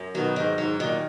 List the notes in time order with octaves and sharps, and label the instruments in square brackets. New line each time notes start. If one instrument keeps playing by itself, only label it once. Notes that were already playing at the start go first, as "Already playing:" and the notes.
Already playing: [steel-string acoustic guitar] F#2
[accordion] B2 D#3 [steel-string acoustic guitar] F#3
[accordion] G#2 [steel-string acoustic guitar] D#3
[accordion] G#2 [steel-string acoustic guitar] F#3
[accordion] A#2 [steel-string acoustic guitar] D#3